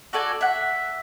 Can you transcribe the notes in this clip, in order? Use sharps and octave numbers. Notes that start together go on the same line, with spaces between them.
F#4 A4 D5 G#5
E5 F#5